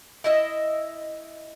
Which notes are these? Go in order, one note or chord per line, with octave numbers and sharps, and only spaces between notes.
E4 D#5 E5